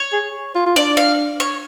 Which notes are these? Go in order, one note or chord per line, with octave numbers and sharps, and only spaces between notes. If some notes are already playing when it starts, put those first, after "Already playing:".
Already playing: C#5
G#4
F4
F4
D4 D5
F5
C#5